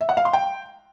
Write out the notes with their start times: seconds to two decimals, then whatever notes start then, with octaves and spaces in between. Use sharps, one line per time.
0.01 E5
0.09 F#5
0.17 F5
0.25 C6
0.33 G5